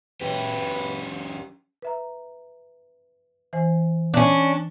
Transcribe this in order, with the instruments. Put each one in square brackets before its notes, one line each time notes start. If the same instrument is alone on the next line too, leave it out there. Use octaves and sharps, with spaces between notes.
[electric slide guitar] F#3 C#4 G4 [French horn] B4
[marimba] B4 E5 A#5
E3 C5 G#5
[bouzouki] C#4 D4